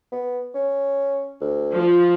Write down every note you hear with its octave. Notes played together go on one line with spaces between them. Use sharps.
B3
C#4
D2
F3